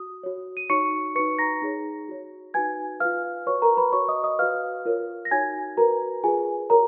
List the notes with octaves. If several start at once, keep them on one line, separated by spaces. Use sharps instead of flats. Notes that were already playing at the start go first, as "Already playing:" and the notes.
Already playing: F#4 D#6
F#4 C#5
D#7
D#4 F#4 C#5 C#6 C#7
D#4 F#4 B4 C#6 C#7
A#5 A#6
D#4 G#4 C#5
F#4 C#5
D#4 F#4 B4 G#5 G#6
F4 B4 F5 F6
F#4 B4 C#5 C#6
A#4 A#5
B4 B5
F#4 C#5 C#6
D#5 D#6
D#5 D#6
F#4 B4 F5 F6
F4 A#4 C#5
A#6
D#4 F#4 C#5 G#5 G#6
F#4 A#4 B4 A#5
F4 G#4 B4 G#5
F#4 A#4 C#5 A#5